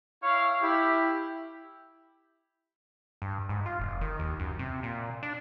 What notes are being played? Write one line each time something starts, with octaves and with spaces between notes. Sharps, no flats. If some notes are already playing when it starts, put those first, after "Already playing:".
E4 C#5 F5
E4 G4
G2
G#2
F4
F1
D#3
D#2
F#2
C3
A#2
D4